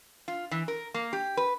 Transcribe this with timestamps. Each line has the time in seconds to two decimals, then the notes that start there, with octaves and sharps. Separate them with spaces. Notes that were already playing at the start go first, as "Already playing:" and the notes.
0.28 F4
0.51 E3
0.68 A#4
0.94 A#3
1.13 G4
1.37 B4